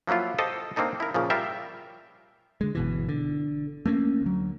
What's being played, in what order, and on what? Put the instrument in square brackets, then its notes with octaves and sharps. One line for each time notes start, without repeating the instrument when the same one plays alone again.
[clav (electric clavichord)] F3 F#3 A#3 E4 F4
G4 A4 C5 D#5 G5 A5
A#3 C4 D4 D#4 A4
E4 A#4
A#2 C#3 F3
G3 F4 A#4 E5 G5
[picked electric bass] D3 G#3
G1 B2 E3
D3
A3 A#3 C#4
D2 F#3